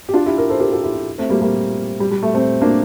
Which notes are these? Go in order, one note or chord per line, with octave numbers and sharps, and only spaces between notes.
G4
D4 F4
E4 G4
G4 A#4
A4 C5
G4 A#4
F4 A4
E4 G4
A3 C4
G3 A#3
G3 A#3
G3
G3
A3
A3 C4
A#3 D4